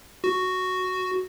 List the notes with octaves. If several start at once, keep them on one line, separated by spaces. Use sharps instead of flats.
F#4